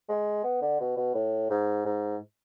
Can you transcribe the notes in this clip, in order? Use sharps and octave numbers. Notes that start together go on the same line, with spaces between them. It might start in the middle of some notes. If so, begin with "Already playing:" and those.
G#3
B3
D3
B2
B2
A2
G#2
G#2